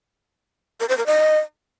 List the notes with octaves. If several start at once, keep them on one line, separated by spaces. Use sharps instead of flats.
A#4
C5
A#4
D#5